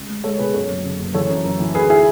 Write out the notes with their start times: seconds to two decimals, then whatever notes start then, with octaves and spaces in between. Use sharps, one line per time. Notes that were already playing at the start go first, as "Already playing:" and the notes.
Already playing: C#2
0.09 G#3
0.24 G#3 A4 C#5
0.38 B2 G#4 B4
0.54 F#2 A4 C#5
0.69 F#1
0.84 C#3
0.99 F#1
1.14 E3 A4 C#5
1.30 F#2
1.45 F#2
1.60 E3
1.75 D2 G#4 B4
1.90 E4 G#4